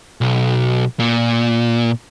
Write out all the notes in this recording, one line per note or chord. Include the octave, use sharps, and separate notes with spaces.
B1
A#2